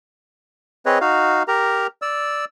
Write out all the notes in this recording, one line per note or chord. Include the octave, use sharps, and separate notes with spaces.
C4 G#4 B4 C#5 D#5
D#4 F#4 F5
G4 A#4 A#5
D5 E6